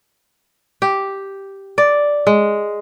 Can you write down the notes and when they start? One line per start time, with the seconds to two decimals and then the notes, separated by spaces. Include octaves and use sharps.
0.82 G4
1.78 D5
2.27 G#3